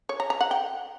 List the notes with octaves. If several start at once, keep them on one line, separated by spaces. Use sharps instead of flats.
C#5
A#5
A#5
F#5
G5